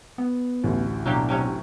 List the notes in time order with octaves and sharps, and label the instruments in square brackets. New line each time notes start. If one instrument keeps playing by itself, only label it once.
[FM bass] B3
[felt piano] A1 D2 A2
[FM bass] B2 [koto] F#3 A#3 G4 [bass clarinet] D4
[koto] C3 F#3 C#4